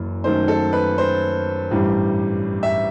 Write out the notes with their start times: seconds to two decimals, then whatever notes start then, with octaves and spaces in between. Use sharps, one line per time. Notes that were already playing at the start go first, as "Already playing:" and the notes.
Already playing: F#1 F#2 E3
0.24 F#2 D#3 A3 D#4 C5
0.48 A4
0.73 B4
0.98 C5
1.71 A1 G2 E3 G3
2.63 E5